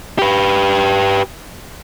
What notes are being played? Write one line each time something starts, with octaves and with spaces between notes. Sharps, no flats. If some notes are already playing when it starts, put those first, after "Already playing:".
G4 B4